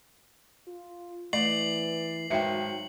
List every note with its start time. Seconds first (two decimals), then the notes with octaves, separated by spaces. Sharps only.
0.67 F4
1.33 E3 A3 D5 C7 F#7
2.30 G#1 D#3 F#3 E5 G5 C#7